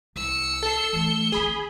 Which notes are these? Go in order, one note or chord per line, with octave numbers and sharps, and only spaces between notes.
C2 E6 C#7
A4 C7 G7
E3 A3
D#3 C4 G#4 B5